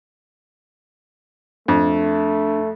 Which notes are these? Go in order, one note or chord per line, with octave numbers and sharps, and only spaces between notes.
F2 A3 D4